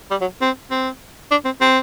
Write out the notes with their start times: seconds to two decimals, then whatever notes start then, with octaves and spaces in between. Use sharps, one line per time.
0.11 G3
0.21 F#3
0.42 C4
0.71 C4
1.31 D4
1.45 C4
1.61 C4